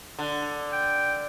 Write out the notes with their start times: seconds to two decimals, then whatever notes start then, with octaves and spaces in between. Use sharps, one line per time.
0.19 D3
0.72 G5